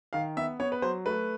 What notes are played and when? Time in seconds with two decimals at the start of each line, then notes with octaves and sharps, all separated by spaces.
0.13 D#3 F5
0.37 B3 E5
0.60 B3 C#5
0.72 B4
0.82 F#3 C5
1.06 A3 B4